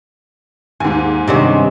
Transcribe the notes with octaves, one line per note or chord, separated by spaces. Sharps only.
D#2 G#2 G#5
G2 C3 D#3 C#4